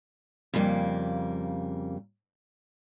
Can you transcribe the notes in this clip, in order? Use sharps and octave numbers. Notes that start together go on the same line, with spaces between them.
F2 C#3 G3 A#3